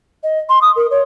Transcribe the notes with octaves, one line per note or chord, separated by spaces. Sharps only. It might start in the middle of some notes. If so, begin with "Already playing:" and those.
D#5
C6
D#6
A#4
C#5